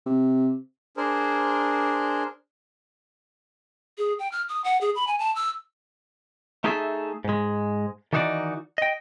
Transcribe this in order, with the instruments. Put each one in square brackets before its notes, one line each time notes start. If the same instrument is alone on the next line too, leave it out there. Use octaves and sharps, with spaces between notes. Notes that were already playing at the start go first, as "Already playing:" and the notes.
[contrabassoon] C3
[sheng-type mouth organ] D4 G#4 A#4 C5
[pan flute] G#4
G5
F6
D#6
F#5
G#4
B5
G#5
A5
E6
[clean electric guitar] A3 D#4 E4 G#4 A4 E5
G#2 G#3
D#3 E3 D#4 F#4 C5 D5
D#5 G5